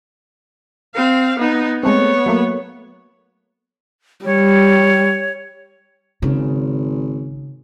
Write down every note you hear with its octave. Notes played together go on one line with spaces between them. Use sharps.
C4 F5
B3 D#4
G#3 A3 B3 C4 C#5
F#3 A3 A#3
G3 C#5
G#1 C#3